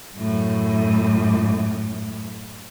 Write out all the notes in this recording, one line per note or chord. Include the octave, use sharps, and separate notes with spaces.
F#2 A2